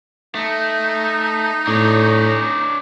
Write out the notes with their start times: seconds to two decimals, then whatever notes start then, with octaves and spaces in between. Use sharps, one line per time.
0.35 A3 D#4
1.67 A2 D4 C#5